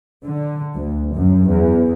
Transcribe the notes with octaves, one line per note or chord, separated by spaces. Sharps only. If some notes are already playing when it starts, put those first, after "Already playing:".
D3
D2
F#2
E2